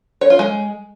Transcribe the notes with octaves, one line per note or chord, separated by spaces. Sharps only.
C#5
F4
G#3